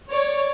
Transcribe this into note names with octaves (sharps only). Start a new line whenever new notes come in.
C#5 D5